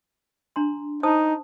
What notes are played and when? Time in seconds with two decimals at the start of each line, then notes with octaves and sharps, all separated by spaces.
0.56 D4 A#5 C6
1.03 D#4 C5 A5 D#6